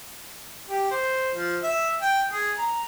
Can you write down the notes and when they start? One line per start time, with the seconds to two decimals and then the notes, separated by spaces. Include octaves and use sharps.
0.69 G4
0.91 C5
1.34 F3
1.63 E5
2.02 G5
2.32 G#4
2.58 A#5